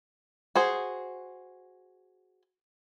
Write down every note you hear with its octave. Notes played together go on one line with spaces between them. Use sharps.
F#4 G#4 C5